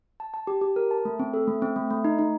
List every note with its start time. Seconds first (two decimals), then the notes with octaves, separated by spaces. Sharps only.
0.20 A5
0.34 A5
0.47 G4
0.61 G4
0.76 A#4
0.91 A5
1.05 A3
1.19 C4
1.34 A4
1.48 A3
1.62 C4
1.76 A3
1.90 A3
2.04 D#4
2.19 D#4